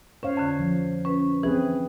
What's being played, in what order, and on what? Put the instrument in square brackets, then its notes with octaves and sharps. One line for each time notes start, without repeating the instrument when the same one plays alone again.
[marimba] C#4 [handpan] C5 C#5 F5
[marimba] F2 D3
[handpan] F3
[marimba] C#4 B4
[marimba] E3 [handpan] C4 G#4 B4